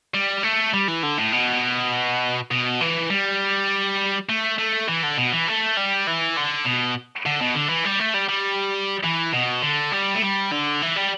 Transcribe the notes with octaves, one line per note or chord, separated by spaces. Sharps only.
G3
A3
G3
E3
D3
A2
B2
B2
E3
G3
A3
A3
E3
D3
B2
E3
A3
G3
E3
D3
B2
D3
B2
D3
E3
G3
A3
G3
G3
E3
B2
D3
G3
A3
G3
D3
E3
G3